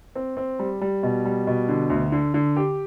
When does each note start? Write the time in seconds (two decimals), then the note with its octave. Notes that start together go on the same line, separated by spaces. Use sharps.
0.15 C4
0.37 C4
0.59 G3
0.81 G3
1.03 B2
1.25 G3
1.47 B2
1.69 D3
1.90 D2
2.12 D3
2.34 D3
2.56 G4